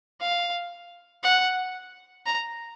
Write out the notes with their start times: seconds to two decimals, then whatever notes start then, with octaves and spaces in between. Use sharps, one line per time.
0.21 F5
1.23 F#5
2.26 A#5